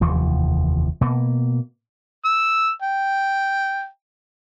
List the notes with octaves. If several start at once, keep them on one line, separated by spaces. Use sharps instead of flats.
F1 D#2 E3 F3
B2 A#3
E6
G5